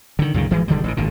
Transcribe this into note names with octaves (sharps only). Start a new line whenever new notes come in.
D3 D#3
C#2 F#2 A#2 D#3
G#1 E3 F3 G#3
E1 D3 D#3 G3
A1 C#3
G#1 A#2 D3